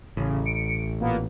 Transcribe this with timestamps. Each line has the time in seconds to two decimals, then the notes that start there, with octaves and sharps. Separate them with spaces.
0.17 A1 C#3
0.45 C#7 D7
1.00 A#2 A#3 B3